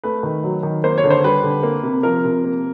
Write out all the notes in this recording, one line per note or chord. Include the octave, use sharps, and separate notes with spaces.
A3 B4
D#3
F#3
D#3
A#3 C5
C#5
D3
C5
G3 B4
D3
A#3
C3
F3 A#4
C3
A#3